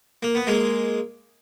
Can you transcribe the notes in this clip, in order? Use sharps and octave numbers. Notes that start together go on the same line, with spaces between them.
A#3
B3
G#3 A#3